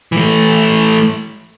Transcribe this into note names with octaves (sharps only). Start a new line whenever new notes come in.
E3 A3